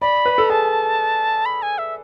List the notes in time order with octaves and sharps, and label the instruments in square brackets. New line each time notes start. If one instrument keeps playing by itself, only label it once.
[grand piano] D5 [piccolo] B5
[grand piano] B4
A4
[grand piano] G#4 [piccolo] A5
[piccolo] B5
G#5
E5